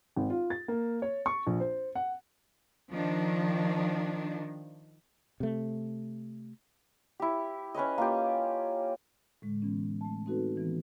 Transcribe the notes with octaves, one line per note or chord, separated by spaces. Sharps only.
G#1
F4
A6
A#3
C#5
C#6
A#1
C5
F#5
D#3 F3 D4
C3 A3
E4 G4
C#4 B4 C#5 D#5
A#3 F4 G4
A2 D3 G#3
E3 B3 C#4
A3 A5
C4 D#4 F#4 A4 B4
D#3 E3 B3